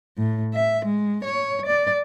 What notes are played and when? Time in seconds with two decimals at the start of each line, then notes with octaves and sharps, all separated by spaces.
0.18 A2
0.54 E5
0.85 G#3
1.25 C#5
1.66 D5